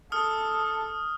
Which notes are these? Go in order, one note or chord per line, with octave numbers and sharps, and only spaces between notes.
A4 D#6 F6